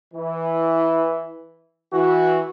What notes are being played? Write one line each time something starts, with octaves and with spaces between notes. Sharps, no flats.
E3
E3 F#4